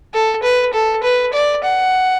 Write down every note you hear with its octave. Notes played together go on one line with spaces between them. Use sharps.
A4
B4
A4
B4
D5
F#5